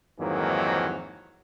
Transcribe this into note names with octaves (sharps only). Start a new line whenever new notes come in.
F2 G#2 D#3 E3 F#3 A#3